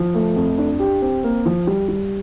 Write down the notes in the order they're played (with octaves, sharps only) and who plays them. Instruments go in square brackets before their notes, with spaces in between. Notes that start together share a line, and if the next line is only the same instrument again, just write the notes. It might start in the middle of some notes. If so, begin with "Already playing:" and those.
Already playing: [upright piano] F3
A3
F2
D4
G4
C4
A#3
F3
G3
G3